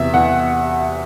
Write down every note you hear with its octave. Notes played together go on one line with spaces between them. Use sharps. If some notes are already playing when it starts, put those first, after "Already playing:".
Already playing: E2 C3 E5
E2 F#5